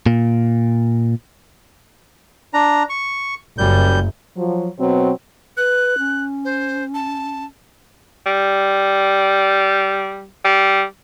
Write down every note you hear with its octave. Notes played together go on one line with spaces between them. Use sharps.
A#2
D4 A#5
C#6
F#1 F#2 G3 G6
F3 F#3
B2 F#3 C4
B4 F#6
C#4
C5
A5
G3
G3